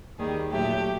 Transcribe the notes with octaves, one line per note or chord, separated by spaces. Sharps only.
D#2 D#3 G3 G#4
A#2 F#3 A3 G4